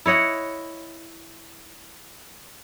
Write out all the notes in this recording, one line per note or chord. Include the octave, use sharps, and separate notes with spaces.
E4 C#5 D#5 F#5